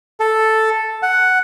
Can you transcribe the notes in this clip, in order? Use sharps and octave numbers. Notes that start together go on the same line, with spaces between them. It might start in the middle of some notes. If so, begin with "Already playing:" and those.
A4
F#5